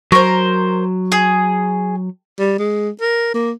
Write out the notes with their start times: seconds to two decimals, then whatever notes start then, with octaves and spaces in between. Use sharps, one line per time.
0.12 F#3 A#4 C5 C#6
1.12 G#4
2.39 G3
2.59 G#3
3.01 A#4
3.34 A#3